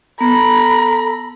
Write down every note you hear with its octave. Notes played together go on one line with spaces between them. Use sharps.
B3 A4 A#5 B5